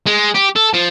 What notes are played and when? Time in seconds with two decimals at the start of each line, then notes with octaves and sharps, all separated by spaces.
0.06 G#3
0.35 G4
0.56 A4
0.73 F3